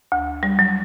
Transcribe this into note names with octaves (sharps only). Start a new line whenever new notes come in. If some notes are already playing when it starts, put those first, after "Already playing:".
D2
G3
F#3